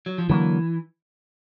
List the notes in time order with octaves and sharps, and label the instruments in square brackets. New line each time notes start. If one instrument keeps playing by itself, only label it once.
[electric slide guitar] F#3
F3
[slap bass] D3 F#3 A#3 [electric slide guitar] E3